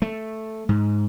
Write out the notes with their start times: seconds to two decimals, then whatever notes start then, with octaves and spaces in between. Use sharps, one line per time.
0.02 A3
0.69 G#2